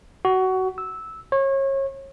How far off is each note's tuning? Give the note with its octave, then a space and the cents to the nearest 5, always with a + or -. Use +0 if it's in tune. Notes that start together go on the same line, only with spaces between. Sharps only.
F#4 +20
E6 -10
C#5 -30